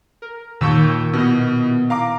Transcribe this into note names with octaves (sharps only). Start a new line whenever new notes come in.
A#4
D#2 A#2 D#3 A#3 C#6 E6 G6
B2 B3 E4 D#5
F5 A#5 D6